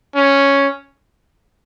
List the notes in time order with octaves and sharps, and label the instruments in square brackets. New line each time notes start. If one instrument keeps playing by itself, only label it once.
[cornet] C#4